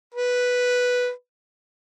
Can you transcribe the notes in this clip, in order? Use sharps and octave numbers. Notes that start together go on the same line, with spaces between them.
B4